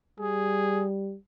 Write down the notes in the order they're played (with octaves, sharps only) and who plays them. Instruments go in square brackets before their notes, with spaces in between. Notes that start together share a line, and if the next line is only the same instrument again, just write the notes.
[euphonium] G3 [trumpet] G#4